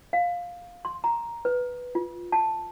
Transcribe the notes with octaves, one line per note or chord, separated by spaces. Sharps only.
F5
C6
A#5
B4
F4
A5